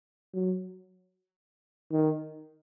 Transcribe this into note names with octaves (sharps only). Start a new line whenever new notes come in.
F#3
D#3